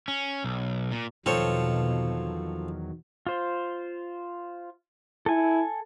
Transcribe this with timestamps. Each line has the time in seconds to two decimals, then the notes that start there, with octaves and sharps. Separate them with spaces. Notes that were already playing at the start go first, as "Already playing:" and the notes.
0.08 C#4
0.44 B1
0.91 A#2
1.26 E2 B2 D#3 F3 F#3 C4 A4 C#5
3.27 F4 C5
5.26 E4 A4 G#5